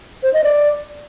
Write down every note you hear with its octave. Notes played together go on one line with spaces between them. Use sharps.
C5
D#5
D5